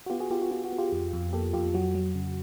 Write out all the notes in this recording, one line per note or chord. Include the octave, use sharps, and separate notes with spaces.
F#4
B3 F4 G4
F#4 G#4
B3 F4 G4
F#4
B3 F4
F#4
B3
F4 G4
F2
F2
A#3 G4 A4
F2 F4 G4
F#3 F#4
F#3
C#3